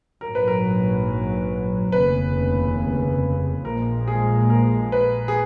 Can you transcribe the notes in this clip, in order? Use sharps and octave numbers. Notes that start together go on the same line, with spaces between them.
A#1 G#2 F#3 A#4
B4
A#4
F1 D#2 C#3 B4
A#1 A#2 F3 G#3 A#4
G#4
A#4
B4
G#4